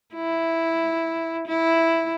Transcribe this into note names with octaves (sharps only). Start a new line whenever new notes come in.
E4
E4